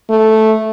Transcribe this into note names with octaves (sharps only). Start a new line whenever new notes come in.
A3